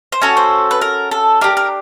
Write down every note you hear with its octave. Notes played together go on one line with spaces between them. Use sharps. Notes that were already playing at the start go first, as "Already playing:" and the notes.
C5
C#4 F#4 A4 C#5
C5
B4
A#4
A4
D4 G4 A#4
A#4